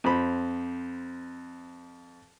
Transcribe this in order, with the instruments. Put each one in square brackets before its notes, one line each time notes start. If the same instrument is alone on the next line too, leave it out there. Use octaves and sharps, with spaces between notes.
[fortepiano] F2 C5 B5